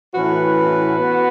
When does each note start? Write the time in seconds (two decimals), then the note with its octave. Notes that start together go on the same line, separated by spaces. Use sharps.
0.15 A2 E3 C#4 F#4 B4
0.99 B3